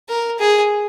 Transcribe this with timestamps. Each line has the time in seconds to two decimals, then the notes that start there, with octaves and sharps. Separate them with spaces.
0.09 A#4
0.39 G#4